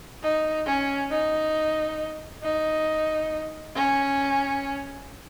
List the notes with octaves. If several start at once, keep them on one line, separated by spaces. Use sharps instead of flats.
D#4
C#4
D#4
D#4
C#4